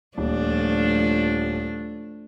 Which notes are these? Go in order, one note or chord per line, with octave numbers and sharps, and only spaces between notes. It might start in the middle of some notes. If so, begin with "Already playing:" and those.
D#1 F3 A3 D4